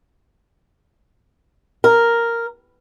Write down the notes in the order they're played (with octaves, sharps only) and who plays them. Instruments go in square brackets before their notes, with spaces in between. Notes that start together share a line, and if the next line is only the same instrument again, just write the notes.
[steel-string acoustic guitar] A#4